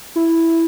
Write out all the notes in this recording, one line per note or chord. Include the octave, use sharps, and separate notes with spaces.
E4